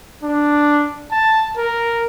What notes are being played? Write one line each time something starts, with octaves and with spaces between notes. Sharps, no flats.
D4
A5
A#4